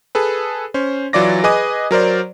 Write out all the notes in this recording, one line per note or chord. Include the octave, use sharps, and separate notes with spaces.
G#4 A4 B4
C#4 C5
E3 F#3 F4 D5 D6 A#6
G#4 B4 D#5 G#5 D6 D#6
F#3 A#4 C5 D5